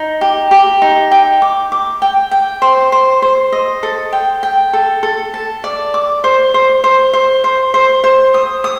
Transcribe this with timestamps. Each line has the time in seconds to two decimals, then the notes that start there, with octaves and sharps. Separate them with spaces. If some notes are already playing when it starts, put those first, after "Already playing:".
Already playing: D#4
0.21 G4
0.51 G4
0.82 D#4
1.11 G5
1.42 D6
1.72 D6
2.02 G5
2.31 G5
2.62 C5
2.92 C5
3.22 C5
3.52 D#5
3.83 A4
4.13 G5
4.43 G5
4.73 A4
5.03 A4
5.34 A5
5.64 D5
5.94 D6
6.24 C5
6.54 C5
6.84 C5
7.13 C5
7.44 C5
7.74 C5
8.04 C5
8.34 D#6
8.64 D#6